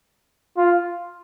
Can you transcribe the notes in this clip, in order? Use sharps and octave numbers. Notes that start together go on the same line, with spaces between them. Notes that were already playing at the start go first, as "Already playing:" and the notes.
F4